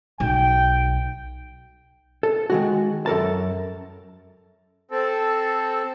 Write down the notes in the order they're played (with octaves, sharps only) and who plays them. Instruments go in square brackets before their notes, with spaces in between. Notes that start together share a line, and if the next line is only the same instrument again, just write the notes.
[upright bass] B1 [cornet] G5
[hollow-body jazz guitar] A4
D#3 G#3 F#4
F#2 A4 A#4 A5
[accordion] C4 A4